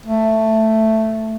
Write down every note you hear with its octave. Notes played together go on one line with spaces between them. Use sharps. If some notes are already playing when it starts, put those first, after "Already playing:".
A3